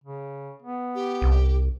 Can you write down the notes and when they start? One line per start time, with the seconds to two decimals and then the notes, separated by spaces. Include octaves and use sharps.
0.04 C#3
0.63 B3
0.95 G4
1.21 C2